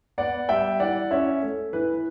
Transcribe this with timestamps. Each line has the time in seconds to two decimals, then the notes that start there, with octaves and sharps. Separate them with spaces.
0.18 B3 D5 F#5
0.49 G3 E5 G5
0.80 E3 D5 F#5
1.11 C#4 C#5 E5
1.42 A3
1.73 E3 B4